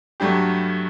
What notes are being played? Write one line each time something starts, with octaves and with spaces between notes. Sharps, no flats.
G2 F#3 A3 D4 G4